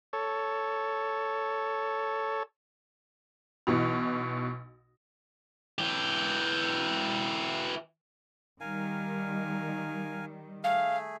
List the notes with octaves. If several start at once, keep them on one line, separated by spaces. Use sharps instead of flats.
A4 C#5
B1 B2 E3
E3 G4
D#3 G3 A#4 F5 G#5
A3 G#4 F5